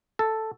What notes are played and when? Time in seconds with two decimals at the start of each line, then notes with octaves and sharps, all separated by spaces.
0.19 A4